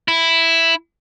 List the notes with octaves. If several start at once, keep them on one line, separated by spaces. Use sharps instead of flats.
E4